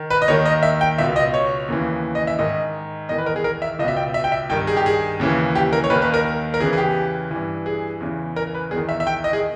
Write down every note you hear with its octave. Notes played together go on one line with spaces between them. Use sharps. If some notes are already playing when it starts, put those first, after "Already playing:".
Already playing: D#3
B4
D#5
D#2 D#3 C#5
D#5
E5
G5
C#2 B2 E5
D#5
C#5
D#2 C#3 E3
D#5
E5
G#2 D#3 D#5
E2 D#3 D#5
B4
A#4
G#4
A#4
E5
C#2 B2 D#5 E5
G5
E5
G5
E5
G2 D#3 G5
G#4
G4
G#4
D#2 C#3 E3
G4
A#4
C#5
D#2 D#3 B4
B4
A#4
A#4
E2 C#3 E3 G#4
G#4
G4
G2 E3
G#4
E2 C#3 E3
A#4
B4
E2 D#3 G#4
E5
E5
G5
D#5
G#4